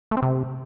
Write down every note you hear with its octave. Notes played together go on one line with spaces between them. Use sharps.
A3
C4
C3